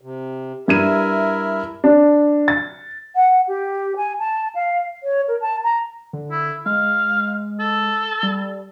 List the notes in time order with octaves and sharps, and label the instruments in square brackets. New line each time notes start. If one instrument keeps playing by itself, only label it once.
[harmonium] C3
[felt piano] G2 G#6 D#7 [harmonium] E4 A#4 E5
[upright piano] D4
A6
[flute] F#5
G4
G#5
A5
F5
C#5
A#4
A5
A#5
[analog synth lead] D3
[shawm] E4
[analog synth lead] G#3 [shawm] F5
[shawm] A4
[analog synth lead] G3